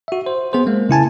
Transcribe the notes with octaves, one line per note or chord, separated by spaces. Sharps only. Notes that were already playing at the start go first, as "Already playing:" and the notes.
F#4 E5
C5
B3 G#4 C5
G#3 A#3
C#3 E4 G#5 A5